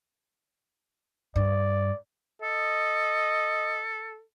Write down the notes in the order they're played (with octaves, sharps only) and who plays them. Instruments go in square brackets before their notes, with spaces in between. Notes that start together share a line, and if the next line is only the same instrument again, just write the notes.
[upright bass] G2 [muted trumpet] D5
[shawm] A4 [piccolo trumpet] D#5